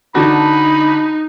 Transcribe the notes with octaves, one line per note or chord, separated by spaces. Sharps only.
D3 D4 D#4 F#4 B5